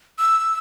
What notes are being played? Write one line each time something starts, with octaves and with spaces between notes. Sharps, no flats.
E6